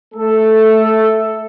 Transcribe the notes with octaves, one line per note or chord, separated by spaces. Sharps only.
A3 A4